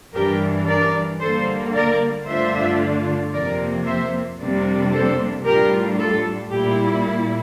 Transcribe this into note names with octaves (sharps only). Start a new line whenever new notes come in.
G2 E3 G3 D4 G4 A#4
A#4 D5
D3 G3 A#3 A4 C5
A#4 D5
G2 D3 A3 D4 F4 C5 E5
F2 C3 F3 A#3 A#4 D5
C5 E5
F2 C3 G3 A#3 D4
A4 C5
A2 G3 D4 F4 G4 A#4
F4 A4
A#2 G3 A#3 E4 G4